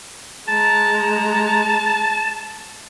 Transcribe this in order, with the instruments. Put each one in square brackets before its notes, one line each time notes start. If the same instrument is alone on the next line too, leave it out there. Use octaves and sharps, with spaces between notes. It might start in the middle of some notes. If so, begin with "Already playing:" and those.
[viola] G#3 A#5 [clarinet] A5